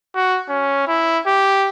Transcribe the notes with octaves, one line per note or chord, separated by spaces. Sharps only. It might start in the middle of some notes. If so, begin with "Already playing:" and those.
F#4
C#4
E4
G4